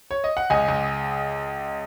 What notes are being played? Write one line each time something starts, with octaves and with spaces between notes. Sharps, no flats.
C#5
D#5
F#5
C#2 D#5 G#5
C#2